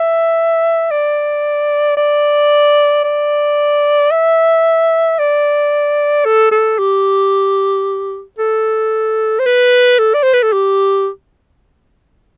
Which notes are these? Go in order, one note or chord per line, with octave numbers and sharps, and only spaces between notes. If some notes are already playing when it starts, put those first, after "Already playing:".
Already playing: E5
D5
D5
D5
E5
D5
A4
A4
G4
A4
C5
B4
A4
D5
C5
B4
A4
G4